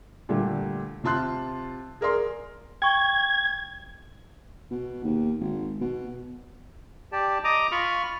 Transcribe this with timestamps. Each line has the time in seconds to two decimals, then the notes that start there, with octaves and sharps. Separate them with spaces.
0.29 A#2 D3 G3 A3
1.04 C3 F4 A5 C6 F#6
2.01 G#4 A#4 D5 C6
2.82 G5 C#6 G#6
4.71 B2
5.04 D#2
5.40 G#1
5.81 B2
7.12 G4 D5 A5
7.44 D#5 A#5 D6 D#6
7.72 F4 B5 C#6 F6